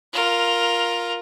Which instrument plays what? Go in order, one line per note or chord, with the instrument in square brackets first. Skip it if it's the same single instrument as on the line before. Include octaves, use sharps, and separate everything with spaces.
[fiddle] F4 A#4